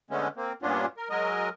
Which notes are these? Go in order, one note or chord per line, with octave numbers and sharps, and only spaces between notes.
D3 G#3 A3 B3 C#4
A#3 C4
G2 A#2 B3 C#4 D4 F4
A#4
F#3 G#3 A#4 D#5